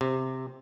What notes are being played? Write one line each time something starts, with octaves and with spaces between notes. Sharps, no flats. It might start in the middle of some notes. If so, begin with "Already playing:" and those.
C3